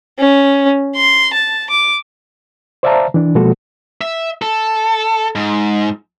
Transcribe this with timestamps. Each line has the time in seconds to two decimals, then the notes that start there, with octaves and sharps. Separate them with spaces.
0.19 C#4
0.96 C6
1.33 A5
1.70 D6
2.83 C5 D5 E5 F5 A5 A#5
3.14 E3 D4
3.35 B2 F3 G#3 A#3 F#4 A4
4.01 E5
4.42 A4
5.35 G#2